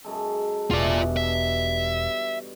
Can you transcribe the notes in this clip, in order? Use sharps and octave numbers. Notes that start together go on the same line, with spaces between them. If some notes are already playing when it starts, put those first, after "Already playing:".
F#2 G#3 A4
E1 G2 B2 E3 F4 D5
E5